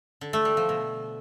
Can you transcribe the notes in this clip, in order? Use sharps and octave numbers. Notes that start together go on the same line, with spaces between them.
D3
A3
G3
F3
B2